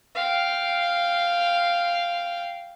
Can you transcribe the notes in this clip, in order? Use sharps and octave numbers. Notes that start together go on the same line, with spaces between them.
F5 G5